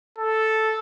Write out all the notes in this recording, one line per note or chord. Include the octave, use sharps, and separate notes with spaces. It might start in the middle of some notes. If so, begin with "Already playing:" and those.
A4